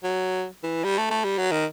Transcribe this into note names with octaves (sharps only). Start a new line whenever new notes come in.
F#3
E3
G3
A3
A3
G3
F#3
D#3